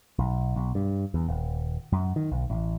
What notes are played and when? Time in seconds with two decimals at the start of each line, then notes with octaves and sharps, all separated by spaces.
0.19 B1
0.56 B1
0.75 G2
1.14 E2
1.28 D#1
1.92 F#2
2.16 D#3
2.32 B1
2.50 A1